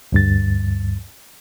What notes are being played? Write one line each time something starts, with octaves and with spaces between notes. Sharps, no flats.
D2 G2 A6